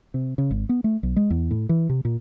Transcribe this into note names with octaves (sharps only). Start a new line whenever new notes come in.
C3
C#3
G#1
B3
A3
B1
G#3
E2
A2
E3
C3
A#2